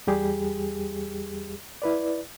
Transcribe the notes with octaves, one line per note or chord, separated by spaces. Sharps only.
E2 G3 G4 G#4
E4 B4 D5